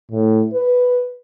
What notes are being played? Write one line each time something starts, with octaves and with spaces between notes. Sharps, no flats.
A2
B4